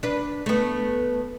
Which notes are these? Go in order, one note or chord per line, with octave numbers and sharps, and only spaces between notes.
D4 B4
A3 B3